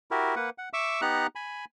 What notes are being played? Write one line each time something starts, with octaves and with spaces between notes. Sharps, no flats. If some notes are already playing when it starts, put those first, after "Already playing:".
E4 F#4 G4 A#4
A#3 B4 F#5
F#5
E5 C#6 D6 E6
B3 D#4 G4 F#5 A#5 F#6
G#5 B5